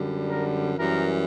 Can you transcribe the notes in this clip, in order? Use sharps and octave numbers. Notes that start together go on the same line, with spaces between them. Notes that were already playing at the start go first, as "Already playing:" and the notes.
Already playing: F#2 D3 G3
A#4
F#2 E3 G3 A#4